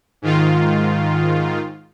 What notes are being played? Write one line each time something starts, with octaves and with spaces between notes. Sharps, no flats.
G#2 D#3 F4